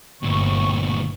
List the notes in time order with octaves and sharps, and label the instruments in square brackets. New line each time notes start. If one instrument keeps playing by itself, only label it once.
[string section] G1 C#6 [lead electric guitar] D2 A#2